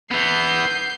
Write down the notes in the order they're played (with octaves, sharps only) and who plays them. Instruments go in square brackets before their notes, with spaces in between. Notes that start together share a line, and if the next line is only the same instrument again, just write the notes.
[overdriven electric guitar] E3 B3 [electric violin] G6 C7